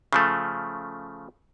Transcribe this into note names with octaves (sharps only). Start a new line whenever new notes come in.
C#3 F3 A3